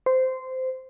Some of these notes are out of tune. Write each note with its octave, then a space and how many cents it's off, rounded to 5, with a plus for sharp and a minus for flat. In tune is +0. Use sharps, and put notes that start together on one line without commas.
C5 -15